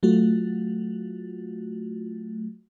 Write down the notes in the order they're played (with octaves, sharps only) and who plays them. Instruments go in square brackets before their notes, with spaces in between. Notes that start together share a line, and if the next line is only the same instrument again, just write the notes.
[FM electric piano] F#3 A3 F4 F#4